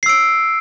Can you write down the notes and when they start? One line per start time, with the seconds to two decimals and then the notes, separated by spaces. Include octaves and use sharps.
0.03 C7
0.06 E6
0.09 D7